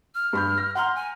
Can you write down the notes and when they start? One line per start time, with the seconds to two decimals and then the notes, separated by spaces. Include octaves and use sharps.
0.15 F6
0.33 G2 B5 G6
0.58 A#6
0.75 F#5 A#5 C6 F6
0.95 G#5